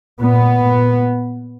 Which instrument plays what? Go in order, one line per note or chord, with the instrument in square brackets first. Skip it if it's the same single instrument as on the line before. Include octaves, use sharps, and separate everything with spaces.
[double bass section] A#2 B3
A#2